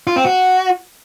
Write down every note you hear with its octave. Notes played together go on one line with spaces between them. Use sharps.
F4
C4
F#4